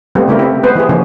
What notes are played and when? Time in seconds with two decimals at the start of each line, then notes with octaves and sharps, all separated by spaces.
0.15 G3 A3 B3 C4 F4
0.28 C#3 A3 E4 G4 A#4
0.39 C4 E4
0.63 G#3 B3 B4 C5
0.75 E3 E4 G4 G#4
0.89 C#3 F3 A#3 C#4